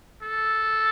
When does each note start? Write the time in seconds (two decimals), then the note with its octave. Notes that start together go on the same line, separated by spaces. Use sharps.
0.22 A4